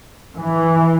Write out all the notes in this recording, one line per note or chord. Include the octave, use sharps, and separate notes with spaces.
E3